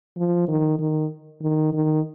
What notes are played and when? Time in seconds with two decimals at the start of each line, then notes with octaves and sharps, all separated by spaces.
0.17 F3
0.48 D#3
0.79 D#3
1.41 D#3
1.73 D#3